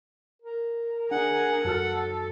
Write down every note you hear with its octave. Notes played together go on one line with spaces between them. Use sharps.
A#4
D4 G#4 F#5
F#2 F#4 A4 F6